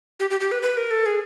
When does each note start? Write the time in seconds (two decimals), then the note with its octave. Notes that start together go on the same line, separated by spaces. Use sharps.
0.20 G4
0.30 G4
0.40 G4
0.52 B4
0.62 B4
0.77 A#4
0.91 A4
1.06 G#4